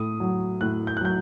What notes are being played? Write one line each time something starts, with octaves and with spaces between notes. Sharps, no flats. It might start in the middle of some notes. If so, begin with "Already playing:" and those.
Already playing: A2 D#6
F#3
A2 F#6
G6
F#6
F#3 G6